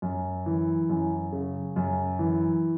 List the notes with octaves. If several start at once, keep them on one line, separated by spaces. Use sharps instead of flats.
F#2
E3
F#2
C#3
F#2
E3